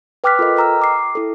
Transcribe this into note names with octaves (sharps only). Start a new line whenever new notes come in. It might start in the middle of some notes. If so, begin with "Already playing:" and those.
B4 G5 D6 F6 F#6 B6
F4 A4 A#4 D#5
D#5 G5 A#5 E6 F6
D6 C7
E4 A4